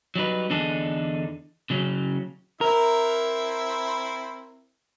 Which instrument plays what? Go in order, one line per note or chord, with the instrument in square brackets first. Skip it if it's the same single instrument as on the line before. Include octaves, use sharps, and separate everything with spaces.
[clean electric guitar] F#3 G3 D#4 B4
E2 D3 D4 D#4 G#4 A4
C#3 F#3 C#4
[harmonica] C4 E4 E5 [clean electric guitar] A#4